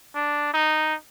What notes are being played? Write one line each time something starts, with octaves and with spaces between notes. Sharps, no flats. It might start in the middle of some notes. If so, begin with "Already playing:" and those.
D4
D#4